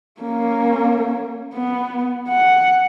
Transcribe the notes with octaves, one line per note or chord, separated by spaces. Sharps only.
A#3 C#4
B3
F#5